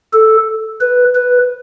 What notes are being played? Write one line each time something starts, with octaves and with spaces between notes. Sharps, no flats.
A4
B4
B4